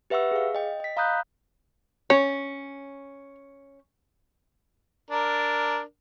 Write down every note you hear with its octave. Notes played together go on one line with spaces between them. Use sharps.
G4 B4 E5 F#5 C#6 E6
G#4 F5
D#5 G5
D#5 B6
F5 A#5 B5 D#6 F#6 G6
C#4 C#5
D4 A#4